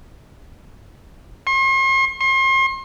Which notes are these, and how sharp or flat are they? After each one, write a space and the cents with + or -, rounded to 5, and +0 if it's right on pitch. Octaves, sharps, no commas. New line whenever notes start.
C6 +45
C6 +40